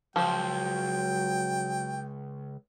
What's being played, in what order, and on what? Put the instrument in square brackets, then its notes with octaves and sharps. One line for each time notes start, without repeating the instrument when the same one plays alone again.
[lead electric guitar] C#2 [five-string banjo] F3 [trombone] F#3 [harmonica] G5